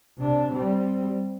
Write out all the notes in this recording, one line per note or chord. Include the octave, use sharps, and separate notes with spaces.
C3 D4
G3 C4